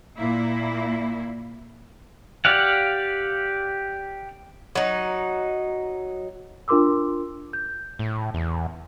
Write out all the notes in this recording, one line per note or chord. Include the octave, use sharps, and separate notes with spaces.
A#2 A#3 E4
G4 D5 F5 F#5
F#3 D#4
D4 F4 A#4 C6 D6 E6
G6
A2
E2